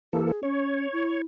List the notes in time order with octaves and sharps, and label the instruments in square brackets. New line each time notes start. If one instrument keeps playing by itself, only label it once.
[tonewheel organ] E3 A#3 A4 [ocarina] G4
[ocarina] G#4
[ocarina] C#4 [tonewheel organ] C#5
[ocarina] E4